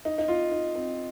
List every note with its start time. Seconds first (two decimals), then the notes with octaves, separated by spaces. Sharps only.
0.05 D#4
0.18 D#4
0.28 F4
0.51 D#4
0.75 C4